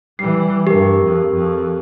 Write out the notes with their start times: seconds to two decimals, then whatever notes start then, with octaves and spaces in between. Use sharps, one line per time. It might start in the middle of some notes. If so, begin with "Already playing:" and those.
0.19 E3 G3 C7
0.67 G2 G4 A#4
1.04 F2
1.34 F2